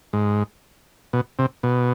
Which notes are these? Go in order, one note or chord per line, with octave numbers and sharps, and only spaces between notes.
G#2
B2
C3
B2